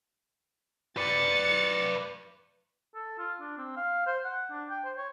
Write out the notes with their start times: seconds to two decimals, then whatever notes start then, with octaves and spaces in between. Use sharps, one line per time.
0.97 B4 D5 A6 C#7
2.95 A4
3.19 F4
3.41 D4
3.58 C4
3.77 F5
4.07 C5
4.25 F#5
4.51 D4
4.70 G5
4.85 C5
4.98 C#5